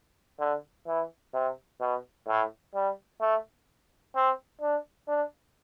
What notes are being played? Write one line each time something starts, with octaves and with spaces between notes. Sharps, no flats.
D3
E3
C3
B2
A2
G3
A3
C4
D4
D4